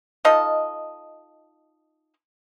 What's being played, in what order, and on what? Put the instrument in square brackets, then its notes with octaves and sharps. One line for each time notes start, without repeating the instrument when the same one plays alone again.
[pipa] D#4 F4 A4 D#5